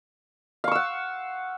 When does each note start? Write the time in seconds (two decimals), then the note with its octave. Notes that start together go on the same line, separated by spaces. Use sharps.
0.64 F5
0.68 C#6
0.72 E6
0.75 F#5